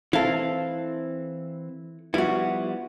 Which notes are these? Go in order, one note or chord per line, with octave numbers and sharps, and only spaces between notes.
E3 C4 E4 A4 F5
F3 G3 B3 E4 F#4